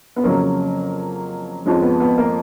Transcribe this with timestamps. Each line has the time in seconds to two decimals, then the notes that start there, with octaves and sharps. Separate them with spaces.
0.16 B3
0.23 F2 C#3 F#3 A#3 C#4
1.66 F2 F3 G#3 C#4
1.82 B3
2.00 B3
2.18 A#3